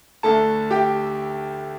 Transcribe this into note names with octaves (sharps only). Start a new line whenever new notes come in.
D2 D3 A3 A4 A5
G4 G5